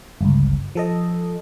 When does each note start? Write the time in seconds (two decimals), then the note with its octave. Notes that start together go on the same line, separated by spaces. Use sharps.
0.21 G1 C#2
0.75 F3 A4 D#5